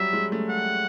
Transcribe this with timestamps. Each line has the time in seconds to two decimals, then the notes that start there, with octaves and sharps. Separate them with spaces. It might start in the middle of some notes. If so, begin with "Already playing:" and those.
Already playing: F#3 G3 E5
0.13 G#3
0.32 A3
0.50 F#5